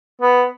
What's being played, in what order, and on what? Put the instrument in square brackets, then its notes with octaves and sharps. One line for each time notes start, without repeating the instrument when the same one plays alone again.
[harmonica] B3